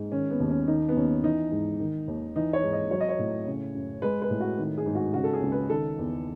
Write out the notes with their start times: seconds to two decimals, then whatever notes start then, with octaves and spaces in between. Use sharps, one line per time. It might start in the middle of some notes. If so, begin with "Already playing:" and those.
Already playing: G#2
0.12 D#3 C#4
0.30 B3
0.40 D#2
0.50 C#4
0.67 D#3 D#4
0.89 B3
0.96 D#2 C#4
1.24 E3 D#4
1.51 G#2
1.80 D#3
2.08 D#2
2.36 E3 D#4
2.53 C#5
2.63 G#2
2.73 D#5
2.91 F#3 C#5
3.00 D#5
3.09 C#5
3.19 A2
3.46 C#3
3.75 F#2
4.02 G#3 B4
4.22 B4
4.30 A2
4.40 F#4
4.58 D#3
4.78 G#4
4.86 G#2
4.95 F#4
5.14 C#3 F#4
5.24 A4
5.33 G#4
5.42 C#2
5.52 B4
5.70 D#3 A4
5.98 E2